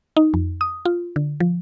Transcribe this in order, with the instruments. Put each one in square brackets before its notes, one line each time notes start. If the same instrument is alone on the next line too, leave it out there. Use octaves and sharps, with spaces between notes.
[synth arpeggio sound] D#4
F2
D#6
F4
D3
F3